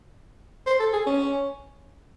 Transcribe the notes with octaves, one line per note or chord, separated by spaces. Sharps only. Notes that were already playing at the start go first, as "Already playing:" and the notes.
C5
A4
G#4
C#4